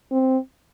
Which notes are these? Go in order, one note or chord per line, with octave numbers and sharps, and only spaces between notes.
C4